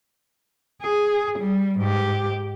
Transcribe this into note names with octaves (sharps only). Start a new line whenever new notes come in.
G#4
G3
G#2 G4